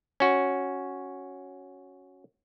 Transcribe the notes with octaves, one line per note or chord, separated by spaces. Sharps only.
C#4 F#4